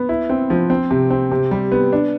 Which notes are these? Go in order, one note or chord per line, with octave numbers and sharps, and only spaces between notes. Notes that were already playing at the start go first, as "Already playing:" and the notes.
Already playing: B3
E4
C4
F3
C4
C3
C4
C3
G3
B3
D4